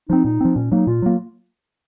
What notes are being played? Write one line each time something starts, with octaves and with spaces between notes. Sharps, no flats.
F3 C4 D#4
A#2 D#4
F3 C4
A#2 C#4
F#3 A#3 D#4
A#2 F4
F#3 A#3